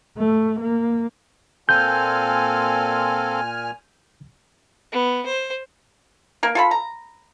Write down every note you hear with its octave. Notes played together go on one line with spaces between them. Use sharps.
A3
A#3
A#2 C4 F4 A4 G#5 F6 G6
B3
C5
A#3 A#4
F4 A4 B5
A#5